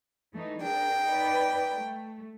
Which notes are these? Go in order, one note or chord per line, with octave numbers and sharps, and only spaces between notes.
E3 A3 D#4
D4 G#4 A#4 G5
D#4 B4 D5
A3